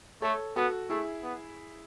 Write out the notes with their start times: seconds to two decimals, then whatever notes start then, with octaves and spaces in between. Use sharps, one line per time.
0.22 A3 A4 C#5
0.56 B3 F#4 A4
0.90 A3 E4 G#4
1.23 B3